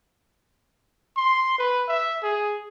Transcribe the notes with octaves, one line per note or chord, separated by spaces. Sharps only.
C6
B4
E5
G#4